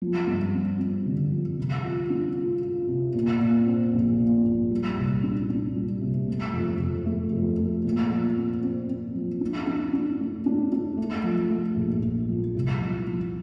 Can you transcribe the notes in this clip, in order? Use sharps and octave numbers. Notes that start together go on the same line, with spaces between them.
F3
G2
C4
C4
D3
F3
C3
F4
D4
F4
F4
C3
A#2
A#2
C4
A#1
A#2
A#1
G3
C2
D4
D4
G3
C3
A3
F2
F2
A3
F2
A3
A#2
F3
C4
C4
C4
F3
D4
D4
D4
A3
D4
D4
A3
F3
A3
A#1
A#1
F3
C2
F3
F3